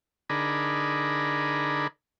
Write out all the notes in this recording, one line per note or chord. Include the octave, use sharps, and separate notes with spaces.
D3 D4 D#4 G#4 A#4 B5